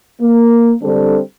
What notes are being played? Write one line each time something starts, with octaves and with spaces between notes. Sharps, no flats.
A#3
D3 G3 C4 D4 A4